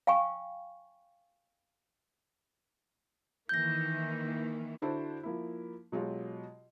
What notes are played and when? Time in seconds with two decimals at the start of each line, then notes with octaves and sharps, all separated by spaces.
0.07 F5 G5 G#5 C#6
3.49 D#3 E3 A#3 G6 A#6
4.82 D3 D4 E4 F#4 A4 C5
5.23 F3 A#3 E4
5.92 B2 F#3 G#3 F4 G4